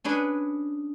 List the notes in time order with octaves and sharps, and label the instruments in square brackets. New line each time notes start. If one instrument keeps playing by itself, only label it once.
[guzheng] C#4 D4 G#4 B4